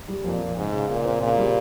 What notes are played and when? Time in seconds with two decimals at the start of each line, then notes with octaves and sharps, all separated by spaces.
0.08 G3
0.24 F2 A#2
0.40 F2
0.57 G#2 C#3
0.72 C#3
0.90 A#2 C#3
1.05 C4
1.21 A#2 C#3
1.38 G3